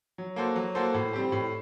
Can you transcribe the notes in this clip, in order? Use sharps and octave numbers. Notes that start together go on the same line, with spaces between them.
F#3
A#3 F#4 A4 C5
F#3
A#3 F#4 A4 C5
A2
G3 C4 G4
A2